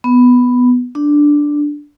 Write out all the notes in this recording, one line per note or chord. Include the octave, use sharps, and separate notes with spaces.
B3
D4